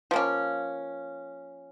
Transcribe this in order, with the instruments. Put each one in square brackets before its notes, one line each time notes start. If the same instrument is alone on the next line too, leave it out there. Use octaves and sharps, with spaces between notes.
[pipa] F3 A#3 C#4